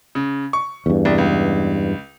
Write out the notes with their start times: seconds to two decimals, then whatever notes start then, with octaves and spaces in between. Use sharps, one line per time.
0.15 C#3
0.53 C#6
0.86 E2 G2
1.05 C2
1.18 C#2